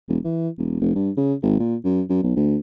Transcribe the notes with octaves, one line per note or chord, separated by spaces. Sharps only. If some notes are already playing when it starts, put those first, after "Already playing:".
E1
E3
E1
F1
G2
C#3
G#1
A#2
F#2
F#2
B1
D2